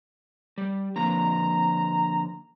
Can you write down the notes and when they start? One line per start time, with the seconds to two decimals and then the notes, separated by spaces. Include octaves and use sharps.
0.58 G3
0.96 D3 F3 A#3 A#5